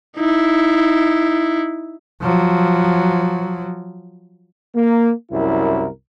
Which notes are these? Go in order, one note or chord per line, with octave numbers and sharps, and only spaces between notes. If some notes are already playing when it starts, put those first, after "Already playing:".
D#4 E4
F3 F#3
A#3
C2 F#2 E4 A#4